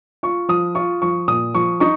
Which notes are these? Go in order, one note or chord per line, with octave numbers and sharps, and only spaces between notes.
F4 C#6
F3 D#6
F4 C#6
F3 C#6
A#2 D#6
F3 C#6
D#4 C#6